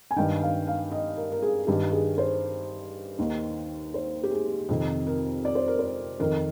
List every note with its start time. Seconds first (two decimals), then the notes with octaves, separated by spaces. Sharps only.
0.11 G#5
0.16 G2 D#3 G5
0.42 F5
0.67 F5
0.92 D#5
1.17 A#4
1.32 A#4
1.42 G#4
1.67 G2 D#3 G4
1.92 G#4
2.18 C5
3.19 D#2 D#3
3.94 C5
4.23 G4
4.31 G#4
4.69 F2 C3 D#3
5.07 A#4
5.45 D5
5.55 C5
5.68 A#4
5.79 C5
6.20 F2 D#3 A#4